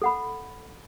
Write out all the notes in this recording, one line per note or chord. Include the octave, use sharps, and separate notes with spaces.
A4 F#5 B5